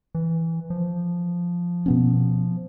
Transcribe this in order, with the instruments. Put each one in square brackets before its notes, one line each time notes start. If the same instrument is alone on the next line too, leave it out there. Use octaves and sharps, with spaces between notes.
[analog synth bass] E3
F3
[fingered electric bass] B2 B3 C#4